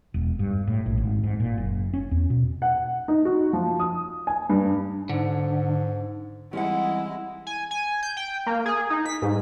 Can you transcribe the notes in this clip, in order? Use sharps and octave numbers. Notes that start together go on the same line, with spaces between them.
E1
G2
A2
A#1
G#1
G#2
A#2
F#1
C#4
E2
B2
F#5
D#4
F#4
F3
D#6
G#5
G2
G#2 D3
E3 G3 G#3 C4 C#4 E4 F#5
G#5
G#5
G6
G5
A#3
G#4
D#4
B6
G#2